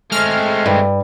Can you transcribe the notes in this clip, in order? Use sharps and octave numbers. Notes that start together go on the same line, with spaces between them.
G#3 A3 C4 F6
G2